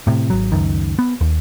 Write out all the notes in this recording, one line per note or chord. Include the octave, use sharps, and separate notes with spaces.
A2 C3
G#1 F#3
C#2 F#2 D#3
B3
D#2